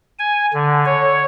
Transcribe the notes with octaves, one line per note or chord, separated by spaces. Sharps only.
G#5
D3
C#5